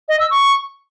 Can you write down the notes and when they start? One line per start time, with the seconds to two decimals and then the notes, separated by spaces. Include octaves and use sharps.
0.08 D#5
0.20 E6
0.31 C#6